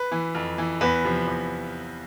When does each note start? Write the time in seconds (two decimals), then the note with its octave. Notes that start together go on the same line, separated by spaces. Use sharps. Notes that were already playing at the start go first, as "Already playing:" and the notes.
Already playing: B4
0.12 E3
0.35 F2
0.58 E3
0.81 E2 B4
1.04 C3 F3
1.27 E2